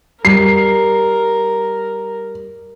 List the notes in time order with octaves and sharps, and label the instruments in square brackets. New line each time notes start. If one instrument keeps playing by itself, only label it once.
[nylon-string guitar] G3 [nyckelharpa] A#4 [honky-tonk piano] C7